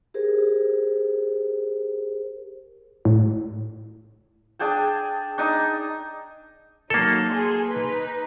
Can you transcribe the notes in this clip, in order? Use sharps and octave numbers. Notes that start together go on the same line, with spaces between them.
G4 G#4 A#4 C5
A2
D4 G#4 G5 A5
D4 D#4 D#6
F#3 A#3 D#4 A4
G#4 C6
D#4 B4